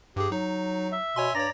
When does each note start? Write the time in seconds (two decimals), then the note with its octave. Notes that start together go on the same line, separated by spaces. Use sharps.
0.16 G2 G4 G#4
0.32 F#3 D#4
0.92 E5
1.16 B2 C#5 G#5 C6
1.35 G2 C#5 D5 A#5 A#6